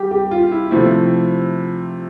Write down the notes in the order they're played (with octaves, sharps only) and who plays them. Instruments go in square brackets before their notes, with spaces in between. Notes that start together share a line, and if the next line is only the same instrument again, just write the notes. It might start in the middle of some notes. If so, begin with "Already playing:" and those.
Already playing: [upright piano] G3 [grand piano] G4
[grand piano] G4
F4
E4
[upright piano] C3 F3 A3 [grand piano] E4